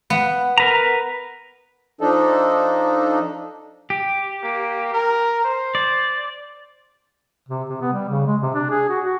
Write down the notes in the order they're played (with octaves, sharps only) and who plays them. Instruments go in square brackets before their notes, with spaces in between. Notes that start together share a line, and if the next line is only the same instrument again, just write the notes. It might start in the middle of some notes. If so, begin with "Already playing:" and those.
[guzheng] B3
[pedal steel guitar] A#4 B4 A#5
[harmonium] F3 D4 D#4 A4
[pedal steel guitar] G4
[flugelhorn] A#3
A#4
C5
[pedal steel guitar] D5
[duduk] C3
C3
B3
G3
C#3
G#3
C3
D4
G#4
F#4
F#4